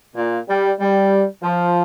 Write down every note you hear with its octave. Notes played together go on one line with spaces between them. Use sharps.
A#2
G3
G3
F3